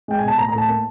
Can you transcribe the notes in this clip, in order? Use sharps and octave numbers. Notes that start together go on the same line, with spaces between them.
G#3 G5
G#5
B2 A5
A2 A#5
A#5
A2
A5
A#3 A5